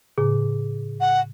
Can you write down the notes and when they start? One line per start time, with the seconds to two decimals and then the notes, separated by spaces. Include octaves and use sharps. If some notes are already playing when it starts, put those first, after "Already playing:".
0.18 A2 C#3 G#4
1.01 F#5